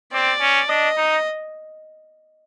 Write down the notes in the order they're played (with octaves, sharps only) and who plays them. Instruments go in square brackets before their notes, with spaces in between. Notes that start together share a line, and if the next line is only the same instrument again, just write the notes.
[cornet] C4 [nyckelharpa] D5
[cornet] C#4
[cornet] D4 [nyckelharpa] D#5
[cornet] D#4